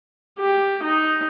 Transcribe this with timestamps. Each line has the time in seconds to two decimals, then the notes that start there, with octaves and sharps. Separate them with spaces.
0.39 G4
0.83 D#4